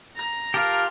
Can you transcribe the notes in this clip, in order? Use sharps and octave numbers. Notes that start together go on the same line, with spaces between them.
A#5
F4 G4 A#4 A5